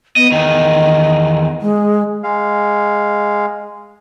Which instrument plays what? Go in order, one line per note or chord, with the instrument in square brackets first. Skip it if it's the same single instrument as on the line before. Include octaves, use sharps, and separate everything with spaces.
[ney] B3 [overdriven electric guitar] D#5
[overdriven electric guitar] E2 D#3 [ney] D#5
[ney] G#3
[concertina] G#3 F5